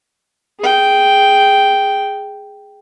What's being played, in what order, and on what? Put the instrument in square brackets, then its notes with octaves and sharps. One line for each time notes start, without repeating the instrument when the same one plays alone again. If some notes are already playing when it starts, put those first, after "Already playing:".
[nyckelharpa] G#4 G5